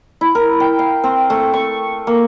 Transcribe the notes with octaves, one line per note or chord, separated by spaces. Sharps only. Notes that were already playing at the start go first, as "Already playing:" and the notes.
E4
A#4
G5
F5
C4
A3
C#6
A#3